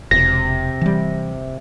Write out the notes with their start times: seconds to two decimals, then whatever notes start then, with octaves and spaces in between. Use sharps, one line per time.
0.11 E1 C3 A#6
0.82 E3 G3